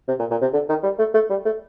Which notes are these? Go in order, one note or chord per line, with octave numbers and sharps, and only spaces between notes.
C3
A#2
A#2
C3
D3
D#3
G3
A3
A3
G3
A3